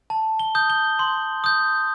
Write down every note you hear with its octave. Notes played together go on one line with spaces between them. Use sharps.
A5
G7
D#6 G6
G7
C6
D#6 G6